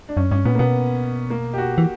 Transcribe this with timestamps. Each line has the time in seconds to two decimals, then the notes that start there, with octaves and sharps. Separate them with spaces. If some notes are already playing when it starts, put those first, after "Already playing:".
0.09 D4
0.17 F#2 C#4
0.31 G2 C#4
0.45 A#2 B3
0.55 A#3
0.59 B2 B3
1.30 A#3
1.53 G4
1.58 F#4
1.78 E3